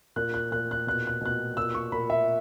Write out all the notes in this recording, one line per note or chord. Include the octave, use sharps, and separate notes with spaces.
A#2 F#6
F#6
A#2 F#6
F#6
B2 F#6
F#6
B2 F#6
A#2 E6
C#6
A#2 B5
E5